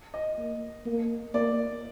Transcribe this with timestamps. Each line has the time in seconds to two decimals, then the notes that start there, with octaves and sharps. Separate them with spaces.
0.14 D#5
0.38 A#3
0.86 A#3
1.34 A#3 D5